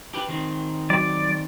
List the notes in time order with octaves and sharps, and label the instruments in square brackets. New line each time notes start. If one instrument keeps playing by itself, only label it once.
[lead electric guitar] G4 B4
D#3 C4
[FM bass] F#3 [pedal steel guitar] D5